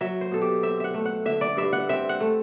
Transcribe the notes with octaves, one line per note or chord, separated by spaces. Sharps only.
F#3 E5
C5
B2 A4
G4
C4 E5
E5 F#5
A3
F#5
D3 E5
D5
G2 E5
F#5
C4 E5
F#5
A3